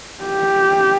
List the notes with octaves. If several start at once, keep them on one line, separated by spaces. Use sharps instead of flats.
G4